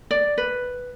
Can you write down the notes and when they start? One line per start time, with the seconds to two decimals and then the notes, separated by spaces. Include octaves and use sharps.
0.11 D5
0.38 B4